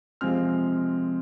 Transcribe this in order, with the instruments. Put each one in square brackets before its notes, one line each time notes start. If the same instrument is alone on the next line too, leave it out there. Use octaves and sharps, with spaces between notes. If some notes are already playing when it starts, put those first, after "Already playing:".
[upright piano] C3 F3 G#3 C4 F6